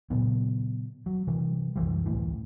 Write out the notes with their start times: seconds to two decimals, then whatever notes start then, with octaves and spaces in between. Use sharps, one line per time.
0.10 A#2 C#3 F#3 B3
1.06 F#3
1.27 C3 E3 G3
1.76 C2 F#2 E3 G3
2.06 G1 D2 A2 E3